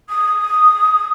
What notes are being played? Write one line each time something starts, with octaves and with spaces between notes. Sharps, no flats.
D#6